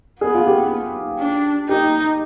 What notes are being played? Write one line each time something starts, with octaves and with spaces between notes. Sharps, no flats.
B3 G#4
F4
G4
D4
D#4 G4